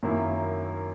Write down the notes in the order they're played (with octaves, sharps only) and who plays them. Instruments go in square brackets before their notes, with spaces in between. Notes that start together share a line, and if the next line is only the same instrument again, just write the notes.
[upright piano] F#2 D#3 F#3 A#3 E4